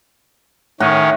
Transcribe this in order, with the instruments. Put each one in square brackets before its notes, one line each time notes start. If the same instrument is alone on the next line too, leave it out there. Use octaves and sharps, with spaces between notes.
[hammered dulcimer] A2 F#4 [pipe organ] D#3 C#4